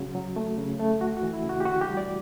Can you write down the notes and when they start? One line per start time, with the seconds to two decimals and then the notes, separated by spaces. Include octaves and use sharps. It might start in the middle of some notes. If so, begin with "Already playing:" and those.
Already playing: C#3 F#3 F#4
0.15 F#3
0.36 A3
0.58 C#3
0.80 A3
1.01 D2 F#4
1.17 F#4
1.23 E3
1.33 E4
1.44 C#3
1.49 F#4
1.60 G4
1.65 D2 F#4
1.81 G4
1.87 G3
1.97 D5